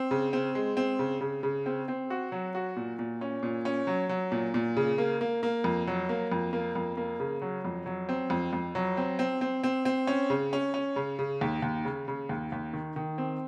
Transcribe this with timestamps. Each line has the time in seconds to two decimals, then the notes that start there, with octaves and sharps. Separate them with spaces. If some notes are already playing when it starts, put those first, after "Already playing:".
Already playing: C4
0.11 C#3
0.33 C4
0.55 G#3
0.77 C4
0.99 C#3
1.21 C#3
1.43 C#3
1.66 C4
1.88 C4
2.10 F#4
2.32 F#3
2.55 F#4
2.76 A#2
2.99 A#2
3.21 C#4
3.43 A#2
3.65 C#4
3.87 F#3
4.09 F#3
4.32 A#2
4.54 A#2
4.77 C#3
4.98 A#3
5.21 A#3
5.43 A#3
5.64 F2
5.87 F#3
6.09 A#3
6.32 F2
6.53 A#3
6.76 F2
6.97 A#3
7.20 C#3
7.42 F#3
7.65 F2
7.86 F#3
8.09 C4
8.30 F2
8.53 F2
8.75 F#3
8.97 C4
9.19 C4
9.41 C4
9.63 C4
9.85 C4
10.07 C#4
10.30 C#3
10.53 C#4
10.74 C#4
10.96 C#3
11.19 C#3
11.41 D#2
11.62 D#2
11.85 C#3
12.08 C#3
12.29 D#2
12.52 D#2
12.73 D#3
12.96 D#3
13.18 C4